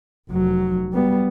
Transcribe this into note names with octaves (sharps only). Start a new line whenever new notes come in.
F1 F#3
G3 B3